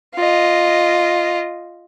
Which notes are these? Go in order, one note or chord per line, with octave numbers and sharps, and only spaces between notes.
F4 D#5